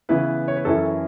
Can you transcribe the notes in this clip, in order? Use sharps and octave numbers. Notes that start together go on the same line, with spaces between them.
C#3 E3 B3 E4 B4
C#5
B4
F#2 E3 C#4 E4 A4